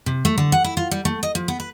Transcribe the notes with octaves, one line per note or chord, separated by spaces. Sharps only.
C3
A3
D3
F#5
E4
F4
G3
A3
D#5
F3
B3
B4